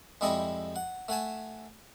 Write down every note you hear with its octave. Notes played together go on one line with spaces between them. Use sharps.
F2 G3 G#3 E4 D#5 A5
F#5
A3 F#5 G#5 A5